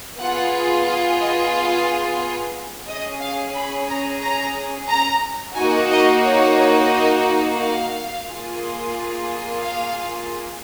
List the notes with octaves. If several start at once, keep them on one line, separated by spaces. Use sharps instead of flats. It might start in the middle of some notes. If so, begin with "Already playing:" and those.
B3 F4 G#4 F#5
F5
D#5
F5
C#4 G#4 D#5
F5
B5
A#5
A#5
A#5
A#3 D#4 F#4 G#5
D#5
C#5
C#5
D#5
F5
A#3 F4 G#4
F5